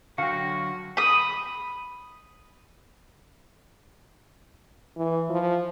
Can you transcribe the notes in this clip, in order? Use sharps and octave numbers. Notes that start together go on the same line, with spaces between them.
D3 F#3 F#4 F5 G5 A#6 C#7
B5 D#6
E3
F3